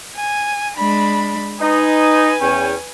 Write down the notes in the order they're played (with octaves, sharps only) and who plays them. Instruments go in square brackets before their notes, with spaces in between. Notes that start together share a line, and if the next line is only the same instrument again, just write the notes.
[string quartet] G#5
G#3 D4 B5
[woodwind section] D#4 [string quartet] B4 G#5
[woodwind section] E2 C#4 G5